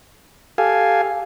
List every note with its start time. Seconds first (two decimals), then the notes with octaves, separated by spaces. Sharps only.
0.58 G4 A4 F5 G#5